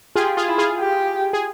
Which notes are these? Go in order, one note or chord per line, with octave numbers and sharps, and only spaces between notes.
F4 G4 G#4
F4 G#4
E4
F4 G#4
G4
G#4